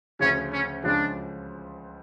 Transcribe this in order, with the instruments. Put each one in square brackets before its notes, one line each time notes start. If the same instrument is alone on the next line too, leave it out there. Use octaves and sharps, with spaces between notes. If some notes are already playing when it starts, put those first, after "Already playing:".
[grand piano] D2 C#3 F3 [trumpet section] C#4
[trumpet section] C#4
[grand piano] C#2 C#3 F3 [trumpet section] D4